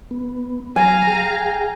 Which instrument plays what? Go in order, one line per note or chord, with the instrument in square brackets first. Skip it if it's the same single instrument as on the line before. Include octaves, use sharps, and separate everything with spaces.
[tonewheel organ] B3
[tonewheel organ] F#3 [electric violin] F5 A#5 [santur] G#5
[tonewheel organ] G#4 G5